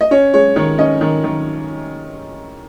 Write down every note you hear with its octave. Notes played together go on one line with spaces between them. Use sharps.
D#5
C#4 C#5
G#3 C#5
D#3 C#5
C#4 D#5
D#3
D#3